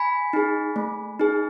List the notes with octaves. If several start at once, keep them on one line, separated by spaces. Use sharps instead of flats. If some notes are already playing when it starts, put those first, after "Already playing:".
Already playing: G#5 B5
D#4 G#4
A3
D#4 G#4